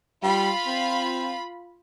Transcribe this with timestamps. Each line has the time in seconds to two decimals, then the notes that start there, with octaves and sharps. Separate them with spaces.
0.23 G3 F4 B5
0.67 C4